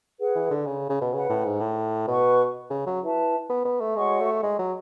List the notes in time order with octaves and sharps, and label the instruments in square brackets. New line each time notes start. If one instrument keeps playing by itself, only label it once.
[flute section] G#4 B4 F#5
[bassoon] E3
D3
C#3
C#3
B2
[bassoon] C#3 [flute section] B4 F#5 B5
[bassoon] A2
G#2
A2
[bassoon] B2 [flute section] B4 F#5 C#6
[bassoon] C#3
F#3
[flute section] E4 B4 E5 A5
[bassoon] B3
B3
A3
[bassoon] G#3 [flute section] F#4 C#5 F#5 C#6
[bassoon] A3
G#3
F#3